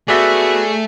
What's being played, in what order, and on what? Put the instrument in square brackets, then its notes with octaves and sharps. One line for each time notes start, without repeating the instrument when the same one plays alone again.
[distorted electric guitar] A3 [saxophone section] B3 F#4 [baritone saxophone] G#4 [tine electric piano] D5 E5